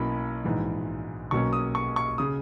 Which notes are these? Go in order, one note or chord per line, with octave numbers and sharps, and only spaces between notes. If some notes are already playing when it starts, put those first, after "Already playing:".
Already playing: B1 B2 A#3 C#4 E4 B5
A#1 G#2 E3
B1 B2 A#3 C#4 C#6
D#6
C#6
C#6
C#3 D#6